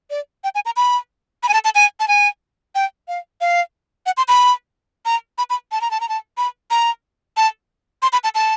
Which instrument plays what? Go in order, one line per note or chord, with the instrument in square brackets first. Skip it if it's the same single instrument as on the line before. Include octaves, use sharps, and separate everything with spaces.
[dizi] D5
G5
G#5
A#5
B5
B5
G#5
A5
A5
G#5
A5
G#5
G5
F5
F5
F#5
C6
B5
A#5
B5
B5
A5
A#5
A5
A#5
A5
B5
A#5
A5
C6
B5
A5
A5